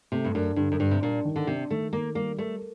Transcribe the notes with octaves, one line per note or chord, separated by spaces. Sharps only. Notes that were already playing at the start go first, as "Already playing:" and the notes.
C3 A3
G2
F#2 D4
G2 D3
F#2
G2 D4
C3
A#2 D4
D#3
D3
C3 D4
D#3 A3
D#3 A#3
G3 A#3
A3 A#4